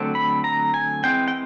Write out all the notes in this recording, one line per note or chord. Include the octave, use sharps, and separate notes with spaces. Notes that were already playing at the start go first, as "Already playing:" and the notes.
Already playing: D3 F#3 A3 C4
B5
A#5
G#5
E3 G#3 C4 G5
G5